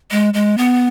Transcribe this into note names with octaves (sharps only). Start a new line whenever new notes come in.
G#3
G#3
B3